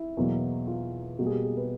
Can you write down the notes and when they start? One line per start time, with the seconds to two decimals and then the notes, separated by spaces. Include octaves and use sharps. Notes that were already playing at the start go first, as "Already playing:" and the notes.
Already playing: E4
0.17 E2 B2 F#3 A#3
0.67 F4
1.19 B2 G3 A#3 F#4
1.26 G#4
1.32 G4
1.44 G#4
1.57 B4